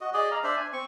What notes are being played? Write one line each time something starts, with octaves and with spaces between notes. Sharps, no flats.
F#4 D#5
G#4 D5 D#5
F5 A#5
D4 C5 D5 E5
G#5
C4 C#6